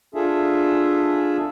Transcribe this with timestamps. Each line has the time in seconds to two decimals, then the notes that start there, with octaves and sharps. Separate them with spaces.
0.15 D4 F4 G#4 A4 E5